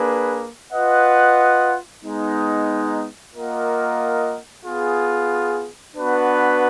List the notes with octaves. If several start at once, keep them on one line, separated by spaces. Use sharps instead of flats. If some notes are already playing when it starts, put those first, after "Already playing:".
Already playing: A#3 D4 G#4 B4
F4 B4 D#5 F#5
G#3 B3 D#4
A#3 F4 A#4 D#5 F#5
B3 F4 G#4
B3 D4 F#4 B4